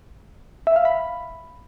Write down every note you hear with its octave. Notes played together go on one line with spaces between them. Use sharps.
E5
F5
B5